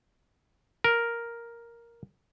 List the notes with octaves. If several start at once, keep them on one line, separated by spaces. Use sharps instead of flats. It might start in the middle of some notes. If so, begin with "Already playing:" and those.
A#4